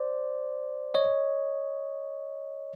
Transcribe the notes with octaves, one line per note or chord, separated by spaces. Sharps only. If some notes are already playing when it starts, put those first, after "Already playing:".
Already playing: C5 D5
C#5 D#5